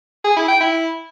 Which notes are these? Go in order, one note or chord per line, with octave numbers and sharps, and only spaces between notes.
G#4
E4
G5
E4